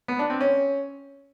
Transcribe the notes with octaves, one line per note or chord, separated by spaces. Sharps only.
B3
D4
C4
C#4